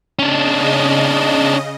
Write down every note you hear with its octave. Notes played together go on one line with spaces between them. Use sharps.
C#3 C#4 D4 D#5